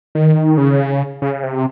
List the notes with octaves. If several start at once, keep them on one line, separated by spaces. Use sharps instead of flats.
D#3
C#3
C#3
C3